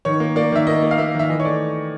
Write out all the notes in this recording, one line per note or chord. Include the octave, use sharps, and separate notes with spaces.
D#3 C#5
A#3
A#3 D5
D#3 E5
A#3 D#5
A#3
F5
A#3 E5
D#3 E5
E3 D#5
C#5
A3 D5